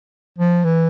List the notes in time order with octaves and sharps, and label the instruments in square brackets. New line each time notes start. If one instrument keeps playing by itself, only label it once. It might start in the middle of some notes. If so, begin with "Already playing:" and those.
[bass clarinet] F3
E3